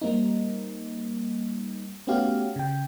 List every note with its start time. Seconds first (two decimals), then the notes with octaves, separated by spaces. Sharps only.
0.02 G3 A#3 C4 D#4
2.07 A3 B3 C#4 F#4 G4 F5
2.56 C#3 G5